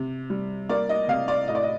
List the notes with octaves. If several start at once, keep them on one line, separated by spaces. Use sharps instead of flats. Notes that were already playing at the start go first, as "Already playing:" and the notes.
Already playing: C3
G3
A#3 D5
D#5
C3 F5
D5
A2 D#5
D5
D#5